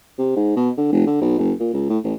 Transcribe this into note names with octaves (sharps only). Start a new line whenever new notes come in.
C3
G#2
B2
D3
F1
D3
B1
F#1
A#2
C#2
A2
A1